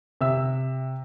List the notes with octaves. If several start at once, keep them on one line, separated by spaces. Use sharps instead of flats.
C3 E5 E6